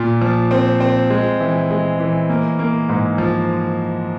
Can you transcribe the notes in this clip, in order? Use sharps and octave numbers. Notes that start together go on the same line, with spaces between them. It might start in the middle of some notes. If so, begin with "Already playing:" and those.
Already playing: A#2
F3
C4
C4
G#3
E3
G#3
E3
A#3
A#3
G#2
F3